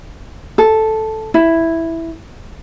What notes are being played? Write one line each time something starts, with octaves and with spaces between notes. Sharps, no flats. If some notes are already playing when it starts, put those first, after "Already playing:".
A4
E4